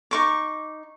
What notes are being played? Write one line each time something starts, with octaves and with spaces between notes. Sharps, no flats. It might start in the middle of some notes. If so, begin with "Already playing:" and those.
D#4 C#6 D6